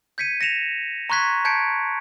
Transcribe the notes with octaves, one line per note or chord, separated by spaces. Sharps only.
G6 G#6 B6 C#7 D#7
A#6 C#7 E7 F7
A#5 C6 C#6 F#6 G#6 B6
A5 G6 G#6 B6 C#7 D7